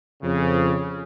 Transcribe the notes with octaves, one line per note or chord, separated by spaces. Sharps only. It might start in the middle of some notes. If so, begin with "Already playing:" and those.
F2 C#3